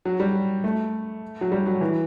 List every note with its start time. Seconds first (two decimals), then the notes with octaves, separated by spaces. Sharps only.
0.05 F#3
0.20 G3
0.64 A3
1.41 F#3
1.52 G3
1.66 F#3
1.81 E3